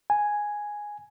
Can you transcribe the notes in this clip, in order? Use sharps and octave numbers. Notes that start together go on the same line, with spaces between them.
G#5